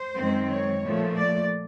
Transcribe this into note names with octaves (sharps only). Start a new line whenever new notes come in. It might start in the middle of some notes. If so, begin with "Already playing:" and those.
Already playing: C5
F#2 D#3 G#3 C4
C#5
A#2 F3 A3
D5